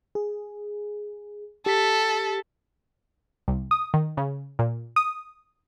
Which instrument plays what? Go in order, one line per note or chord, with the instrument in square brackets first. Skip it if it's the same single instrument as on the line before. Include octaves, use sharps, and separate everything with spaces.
[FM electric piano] G#4
[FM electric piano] G4 B6 [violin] A4
[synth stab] C2
D#6
D#3
C#3
A#2
D#6